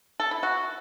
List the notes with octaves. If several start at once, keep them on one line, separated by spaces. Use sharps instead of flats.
A4
E4
F#4